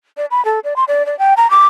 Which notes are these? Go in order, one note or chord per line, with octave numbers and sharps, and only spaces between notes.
D5
B5
A4
D5
C6
D5
D5
G5
A#5
D6